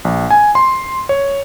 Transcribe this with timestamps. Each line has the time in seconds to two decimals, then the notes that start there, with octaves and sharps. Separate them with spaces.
0.05 A#1
0.31 G#5
0.55 C6
1.09 C#5